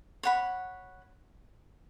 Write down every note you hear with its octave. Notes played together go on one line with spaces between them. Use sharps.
C#5 F#5 B5